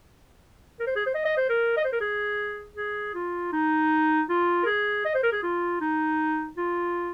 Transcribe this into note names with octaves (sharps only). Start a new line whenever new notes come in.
A#4
C5
G#4
C5
D#5
D#5
C5
A#4
D#5
C5
A#4
G#4
G#4
F4
D#4
F4
A#4
G#4
D#5
C5
A#4
G#4
F4
D#4
F4